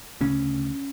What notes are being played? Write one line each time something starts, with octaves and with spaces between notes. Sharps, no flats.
D2 C#3 C#4